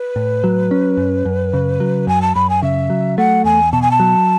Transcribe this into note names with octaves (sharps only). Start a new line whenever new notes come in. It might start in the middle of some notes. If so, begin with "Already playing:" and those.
Already playing: B4
A2
F#3
C#4
F#2
F#2
C#3
F#3
F#2 G#5
A5
F#2 B5
G#5
C#3 E5
F#3
A3 F#5
E2 G#5
B2 A5
G#5
A5
F#3